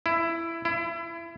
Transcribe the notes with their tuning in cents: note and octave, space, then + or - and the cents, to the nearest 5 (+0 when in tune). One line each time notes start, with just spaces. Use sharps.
E4 +15
E4 +30